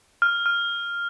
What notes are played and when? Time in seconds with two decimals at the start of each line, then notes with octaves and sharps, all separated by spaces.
0.22 F6
0.46 F6